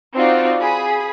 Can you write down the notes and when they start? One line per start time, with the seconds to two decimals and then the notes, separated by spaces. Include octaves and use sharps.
0.14 C4 D#4 F4 F#4 D5
0.60 G#4 B5